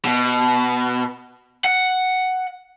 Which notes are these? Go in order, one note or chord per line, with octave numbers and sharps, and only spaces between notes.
B2
F#5